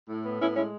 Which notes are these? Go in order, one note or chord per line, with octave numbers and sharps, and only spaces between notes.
A2
B3
A2 C#4 E4
G#3 C#4 E4